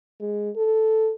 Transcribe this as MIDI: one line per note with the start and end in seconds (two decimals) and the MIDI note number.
0.20 0.50 56
0.56 1.12 69